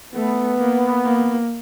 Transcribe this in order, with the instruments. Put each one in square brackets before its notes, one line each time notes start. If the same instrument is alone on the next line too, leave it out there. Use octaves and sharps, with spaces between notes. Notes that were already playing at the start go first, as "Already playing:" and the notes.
[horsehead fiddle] A3 [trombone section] B3
[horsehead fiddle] A#3
A#3